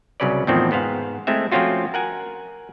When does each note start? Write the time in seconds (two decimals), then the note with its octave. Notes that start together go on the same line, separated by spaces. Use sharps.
0.20 C2 C#3 F#3 C#4 B4 D5
0.47 E2 A2 D#3 F3 C4
0.71 G#2 B3 C5 F5
1.27 G#3 A3 C4 E4 E5
1.51 F3 A3 C4 C#4 F4 F#4
1.94 A#4 F#5 G#5